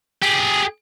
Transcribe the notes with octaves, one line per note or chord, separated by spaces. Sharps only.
G4 G#4